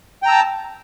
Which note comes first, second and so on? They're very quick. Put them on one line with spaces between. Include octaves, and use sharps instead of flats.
G5 A#5 E6 A5